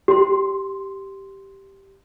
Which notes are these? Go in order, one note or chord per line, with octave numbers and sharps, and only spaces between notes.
G4 C6